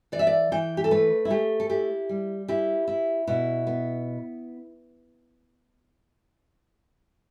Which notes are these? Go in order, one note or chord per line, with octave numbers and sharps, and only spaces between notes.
E3 D5
E5
D5
E3 G5
G4
A4
A3 B4
E4
A3 G4
A4
E4 G4
G3
E4 G4
E4
B2 E4
B3